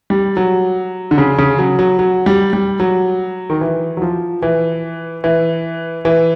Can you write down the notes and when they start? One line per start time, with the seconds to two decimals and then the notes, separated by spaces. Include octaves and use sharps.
0.10 G3
0.37 F#3
1.11 D3
1.18 C#3
1.38 C#3
1.59 F#3
1.79 F#3
1.99 F#3
2.26 G3
2.53 G3
2.80 F#3
3.50 D#3
3.61 E3
3.97 F#3
4.02 F3
4.42 E3
5.24 E3
6.05 E3